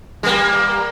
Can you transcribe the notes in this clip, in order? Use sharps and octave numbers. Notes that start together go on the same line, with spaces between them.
G3 A#3